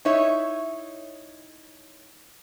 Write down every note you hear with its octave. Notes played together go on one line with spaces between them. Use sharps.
D#4 E4 C#5 E5